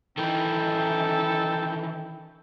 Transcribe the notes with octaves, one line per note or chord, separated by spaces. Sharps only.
D#3 E3 C#4 D#4 E4 A4 G5